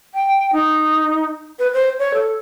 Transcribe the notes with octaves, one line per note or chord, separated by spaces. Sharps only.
G5
D#4
B4
C5
C#5
A4